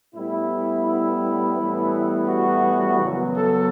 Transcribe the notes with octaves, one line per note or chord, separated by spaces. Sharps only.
A2 G3 B3 E4
E4
A2 E3 G3 B3
F#4
F#2 C#3 F#3 B3
A4